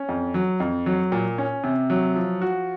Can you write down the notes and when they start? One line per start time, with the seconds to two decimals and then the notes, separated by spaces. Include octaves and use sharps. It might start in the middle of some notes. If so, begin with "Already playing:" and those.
Already playing: C#4
0.09 F2
0.34 F#3
0.60 F2
0.86 F#3
1.12 A#2
1.38 C#4
1.64 C3
1.90 F#3
2.16 F3
2.42 F#4